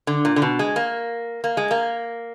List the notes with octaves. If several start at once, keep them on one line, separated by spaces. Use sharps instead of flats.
D3
A#2
D3
B2
G#3
A#3
A#3
G#3
A#3